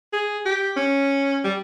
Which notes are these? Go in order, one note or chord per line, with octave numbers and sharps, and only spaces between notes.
G#4
G4
C#4
G3